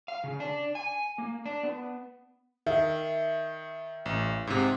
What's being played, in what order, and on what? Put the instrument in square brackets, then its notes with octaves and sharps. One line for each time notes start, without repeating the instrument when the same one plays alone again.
[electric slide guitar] F5
C#3
D4
G#5
A#3
D4
B3
[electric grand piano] D#3 [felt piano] E5
[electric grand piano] A1
G#2 C3